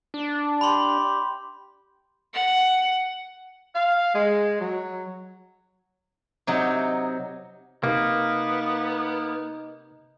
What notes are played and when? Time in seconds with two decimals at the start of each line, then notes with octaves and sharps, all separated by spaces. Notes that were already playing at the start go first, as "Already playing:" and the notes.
0.14 D4
0.61 G4 B5 C6
2.34 F#5
3.75 F5
4.14 G#3
4.60 F#3
6.47 C3 F#3 D#4
7.84 C3 A#3 B3 D#4